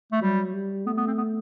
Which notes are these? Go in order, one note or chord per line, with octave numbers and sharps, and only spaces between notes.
A3
F#3 G3
G3
A3 B3
B3
C4
B3